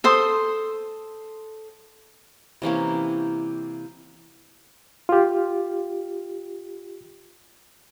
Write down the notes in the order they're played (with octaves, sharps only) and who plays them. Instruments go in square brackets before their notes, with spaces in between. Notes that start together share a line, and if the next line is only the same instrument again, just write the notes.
[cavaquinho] A4 C5 C6 D#6
[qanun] C3 E3 A#3 C#4
[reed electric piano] F4 G4